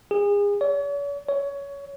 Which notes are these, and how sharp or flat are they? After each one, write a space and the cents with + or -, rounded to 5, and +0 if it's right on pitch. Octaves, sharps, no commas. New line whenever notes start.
G#4 -35
C#5 +45
C#5 +20